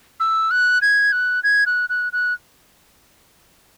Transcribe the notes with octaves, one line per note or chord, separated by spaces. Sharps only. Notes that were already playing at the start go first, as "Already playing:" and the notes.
E6
F#6
G#6
F#6
G#6
F#6
F#6
F#6